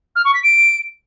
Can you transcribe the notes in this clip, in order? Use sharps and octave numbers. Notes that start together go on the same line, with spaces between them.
F6
C#6
B6
D7